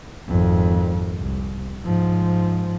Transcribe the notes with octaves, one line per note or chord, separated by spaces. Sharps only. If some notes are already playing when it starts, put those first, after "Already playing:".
G#1 F2
C2
G#2 F3